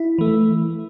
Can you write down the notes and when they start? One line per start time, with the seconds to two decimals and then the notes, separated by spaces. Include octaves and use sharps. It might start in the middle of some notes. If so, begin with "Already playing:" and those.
Already playing: E4
0.18 E3 A3